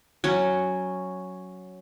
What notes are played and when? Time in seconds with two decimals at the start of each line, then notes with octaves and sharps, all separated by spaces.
0.24 F#3 C#4